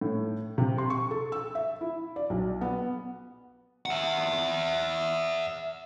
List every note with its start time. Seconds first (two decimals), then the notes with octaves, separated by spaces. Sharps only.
0.01 A2
0.58 C3
0.78 C6
0.90 C#6
1.11 A4
1.32 E6
1.55 E5
1.81 E4
2.16 D5
2.30 B1
2.61 B3
3.86 E5 F#5